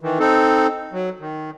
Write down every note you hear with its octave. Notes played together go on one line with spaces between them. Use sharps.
D#3 E3
C4 D#4 A4
F#3
D#3